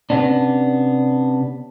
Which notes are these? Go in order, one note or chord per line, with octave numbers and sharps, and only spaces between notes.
C3 B3 C#4 D4